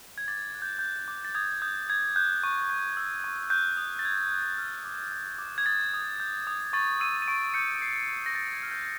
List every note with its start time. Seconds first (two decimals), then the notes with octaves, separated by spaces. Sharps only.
0.18 G#6
0.28 D6 A6
0.54 F#6 G#6
0.62 G6
0.79 F#6 G6
1.08 D6
1.25 A6
1.35 D#6 G#6
1.62 D#6 G6
1.88 D#6 G#6
2.16 F#6 G6
2.43 C#6
2.70 G6
2.97 E6
3.24 C#6
3.50 F#6 G6
3.77 D#6
3.99 A6
4.05 F#6 G#6
4.31 F#6
4.58 F6
4.85 D6
5.12 F6
5.38 D6
5.58 G#6
5.66 D#6 A6
5.94 D#6
6.20 G6
6.47 D#6
6.73 C#6 A6
7.00 E6 D#7
7.22 D#7
7.28 C#6 D7
7.54 G6 C#7
7.81 C#6 C7
8.08 C#6
8.26 A#6
8.35 C#6 A6
8.53 G#6
8.63 F6
8.71 G6